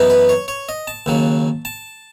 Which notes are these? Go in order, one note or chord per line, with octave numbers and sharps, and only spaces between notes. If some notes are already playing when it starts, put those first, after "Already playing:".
Already playing: F#2 E3 B3 D#4
B4
C#5
C#5
D#5
A5
D#2 C#3 F#3
A5